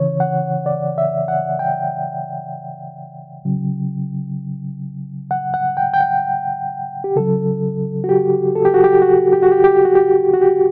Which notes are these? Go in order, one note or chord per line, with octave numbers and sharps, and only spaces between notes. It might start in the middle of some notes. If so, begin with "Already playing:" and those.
Already playing: C#3 E3 C#5
F#5
D5
E5
F#5
G5
C#3 F#3
F#5
F#5
G5
G5
F#5
G4
C#3 F#3 A4
F#4
G4
A4
G4
F#4
G4
F#4
G4
F#4
G4
G4
F#4
G4
F#4
G4